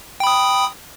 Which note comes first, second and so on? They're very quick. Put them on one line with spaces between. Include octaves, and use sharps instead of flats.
G5 B5 D#6